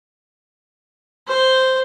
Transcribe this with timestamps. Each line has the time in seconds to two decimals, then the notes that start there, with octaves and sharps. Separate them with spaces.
1.28 C5